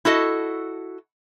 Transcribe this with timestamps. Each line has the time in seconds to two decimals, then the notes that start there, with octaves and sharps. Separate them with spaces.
0.05 E4 F#4 A4 D#5